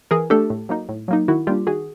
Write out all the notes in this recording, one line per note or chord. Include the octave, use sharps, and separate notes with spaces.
E3 G#4 A#4
A3 D4 G4 A4
A2
F#3 A#3 D#4
A2
F#3 A#3 D#4
D#3 E4 F#4
G3 A#3 D4 F4 G4
D#3 F#4 G#4